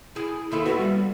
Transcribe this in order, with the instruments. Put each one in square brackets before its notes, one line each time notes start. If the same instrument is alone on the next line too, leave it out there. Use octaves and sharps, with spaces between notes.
[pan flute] E4 [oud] G#4
[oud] D#2 E4 F4 [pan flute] A4
[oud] B3 [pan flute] F#4
[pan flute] G3